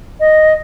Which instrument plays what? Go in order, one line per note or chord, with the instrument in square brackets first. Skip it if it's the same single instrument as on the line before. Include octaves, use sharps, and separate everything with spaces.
[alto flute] D#5